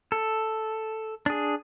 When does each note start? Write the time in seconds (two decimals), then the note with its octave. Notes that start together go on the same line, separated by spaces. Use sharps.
0.12 A4
1.26 D4 G#4